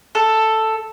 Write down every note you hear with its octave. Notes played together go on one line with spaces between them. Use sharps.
A4